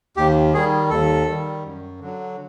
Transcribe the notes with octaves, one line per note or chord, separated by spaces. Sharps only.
D#2 G4
D#3 G3 G#4
D#2 A4
D#3 G3
F#2
D3 F#3